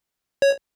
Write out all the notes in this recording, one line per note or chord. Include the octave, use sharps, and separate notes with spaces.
C#5